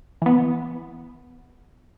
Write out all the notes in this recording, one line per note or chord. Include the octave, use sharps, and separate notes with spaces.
E3 B3